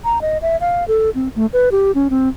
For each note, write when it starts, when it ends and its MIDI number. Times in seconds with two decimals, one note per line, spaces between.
0.04 0.21 82
0.21 0.38 75
0.42 0.57 76
0.61 0.84 77
0.88 1.10 69
1.15 1.29 60
1.36 1.46 57
1.53 1.69 71
1.72 1.92 67
1.95 2.08 61
2.10 2.29 60